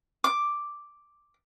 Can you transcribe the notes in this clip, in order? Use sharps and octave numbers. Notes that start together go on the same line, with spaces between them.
D6